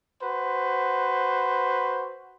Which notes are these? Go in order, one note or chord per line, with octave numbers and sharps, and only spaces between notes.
F#4 B4 C5